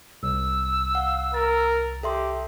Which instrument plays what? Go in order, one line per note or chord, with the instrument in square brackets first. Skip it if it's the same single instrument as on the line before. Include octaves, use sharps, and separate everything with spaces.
[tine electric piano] C2 [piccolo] E6
[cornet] F5 [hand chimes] F#5
[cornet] A#4 [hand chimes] A6
[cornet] G4 [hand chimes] A4 E5 C6